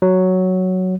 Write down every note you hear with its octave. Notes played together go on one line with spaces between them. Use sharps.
F#3